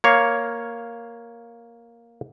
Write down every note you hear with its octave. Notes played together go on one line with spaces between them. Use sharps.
A#3 C#5 F5